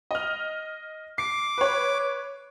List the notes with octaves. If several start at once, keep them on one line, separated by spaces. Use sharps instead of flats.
D#5 F6
D6 C7
B4 C#5